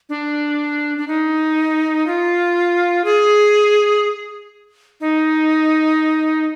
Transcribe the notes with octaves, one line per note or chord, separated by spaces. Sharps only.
D4
D4
D#4
F4
G#4
D#4